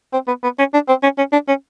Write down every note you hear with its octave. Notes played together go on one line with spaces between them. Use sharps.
C4
B3
B3
C#4
D4
C4
C#4
C#4
D4
C#4